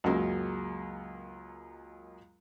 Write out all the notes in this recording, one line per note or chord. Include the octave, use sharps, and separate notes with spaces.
C#2 F#2 F#3 G#3 A#3